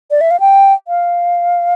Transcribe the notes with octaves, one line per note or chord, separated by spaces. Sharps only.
D5
E5
F5
G5
F5